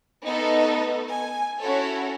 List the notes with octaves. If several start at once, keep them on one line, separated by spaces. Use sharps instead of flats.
A3 B3 D#4 A4 B4
G#5
C#4 E4 F#4 A4 C#5